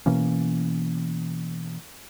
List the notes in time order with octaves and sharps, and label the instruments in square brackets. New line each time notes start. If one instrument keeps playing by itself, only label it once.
[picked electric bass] B2 E3 A#3 C#4